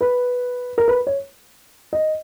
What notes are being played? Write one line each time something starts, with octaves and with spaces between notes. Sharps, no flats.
B4
A#4
B4
C#5
D#5